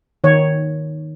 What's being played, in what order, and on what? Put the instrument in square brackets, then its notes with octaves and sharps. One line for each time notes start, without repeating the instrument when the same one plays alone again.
[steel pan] D#3 C#5